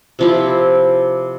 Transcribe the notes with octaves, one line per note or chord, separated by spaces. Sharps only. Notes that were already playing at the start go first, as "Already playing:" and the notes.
C3 F3 E4